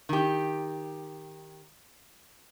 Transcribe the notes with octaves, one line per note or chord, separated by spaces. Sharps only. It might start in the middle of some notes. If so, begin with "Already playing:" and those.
D#3 G4